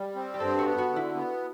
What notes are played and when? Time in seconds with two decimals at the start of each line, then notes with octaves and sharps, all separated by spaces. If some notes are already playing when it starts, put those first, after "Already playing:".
Already playing: G3
0.16 C4
0.34 G4
0.40 G2 A4
0.59 F#4
0.66 B3
0.78 F#4
0.90 D3
0.96 E4
1.15 B3